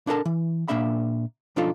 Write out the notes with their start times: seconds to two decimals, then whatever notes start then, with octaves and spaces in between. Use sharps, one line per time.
0.07 D4 E4 A4 A#4 A5
0.25 E3
0.68 A#2 A#3 D4 E5 B5
1.56 B1 F3 D4 D#4 F4 A4